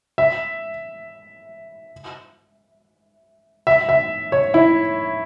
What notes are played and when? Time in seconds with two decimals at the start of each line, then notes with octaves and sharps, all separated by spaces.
0.18 E5
3.67 E5
3.89 E5
4.32 C#5
4.54 E4